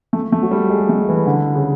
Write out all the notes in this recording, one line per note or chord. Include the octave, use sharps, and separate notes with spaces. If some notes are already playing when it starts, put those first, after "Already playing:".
A3
A3
F#3
G3
G#3
A3
E3
D3
C#3